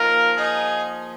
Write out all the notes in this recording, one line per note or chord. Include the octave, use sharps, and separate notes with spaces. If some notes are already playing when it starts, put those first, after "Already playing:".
Already playing: F3 A#3 D#4 F4 A#4
D#4 G#4